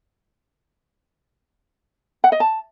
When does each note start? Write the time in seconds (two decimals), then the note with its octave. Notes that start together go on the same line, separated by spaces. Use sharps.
2.24 F#5
2.32 D#5
2.40 A5